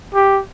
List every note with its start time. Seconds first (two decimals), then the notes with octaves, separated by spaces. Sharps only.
0.14 G4